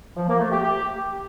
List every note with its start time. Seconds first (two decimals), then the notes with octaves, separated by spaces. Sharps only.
0.17 F3
0.28 A#3
0.40 A3
0.51 G4
0.63 G4